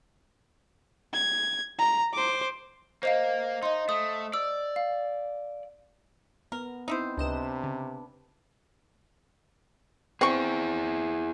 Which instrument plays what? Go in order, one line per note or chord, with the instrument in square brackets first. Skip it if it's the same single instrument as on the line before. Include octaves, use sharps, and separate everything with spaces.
[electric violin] G#6
A#5
C5 D6
[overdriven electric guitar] A#3 [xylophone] C5 D#5 F5
[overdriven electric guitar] D#4 [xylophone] D#5 C6
[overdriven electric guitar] A3 [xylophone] D#6
[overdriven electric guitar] D5 [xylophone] E6
[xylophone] F5
[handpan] B3 [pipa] A#4
[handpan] C4 [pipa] D#4 E4 C5
[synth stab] C#2 D#5 E7 [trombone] C3 [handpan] D4 B4
[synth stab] C#3
[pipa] C4 C#6 [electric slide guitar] E4 G#4